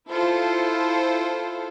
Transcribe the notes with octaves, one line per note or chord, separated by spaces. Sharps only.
E4 F4 A4 C5